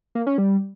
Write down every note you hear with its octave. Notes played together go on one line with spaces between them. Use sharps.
A#3
C#4
G3